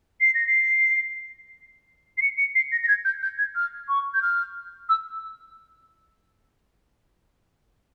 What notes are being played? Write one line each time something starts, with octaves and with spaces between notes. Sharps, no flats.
C7
A#6
C7
C7
C#7
C#7
C7
A#6
A#6
G#6
G6
G6
G#6
F6
C#6
G6
F6
E6